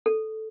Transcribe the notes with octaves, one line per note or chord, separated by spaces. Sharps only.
A4